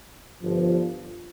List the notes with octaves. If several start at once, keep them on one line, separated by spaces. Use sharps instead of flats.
G1 G2 F3